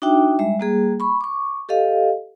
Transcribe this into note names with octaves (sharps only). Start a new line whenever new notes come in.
D4 D#4 F#4 E5 G5 D6
G3 G#3 E5
G3 A#3 G#4
B5 C#6
C#6 D6
G4 A4 D#5 F5